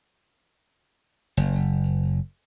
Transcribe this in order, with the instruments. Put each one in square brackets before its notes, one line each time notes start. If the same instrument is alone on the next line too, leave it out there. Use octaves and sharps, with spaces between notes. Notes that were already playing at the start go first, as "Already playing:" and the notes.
[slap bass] F#1